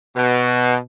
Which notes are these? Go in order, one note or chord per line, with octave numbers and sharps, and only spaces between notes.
B2